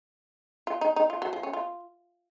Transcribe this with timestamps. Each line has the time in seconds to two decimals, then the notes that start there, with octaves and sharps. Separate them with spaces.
0.67 F4
0.81 D#4
0.96 D#4
1.10 F4
1.22 F#3
1.33 F3
1.43 C#4
1.53 F4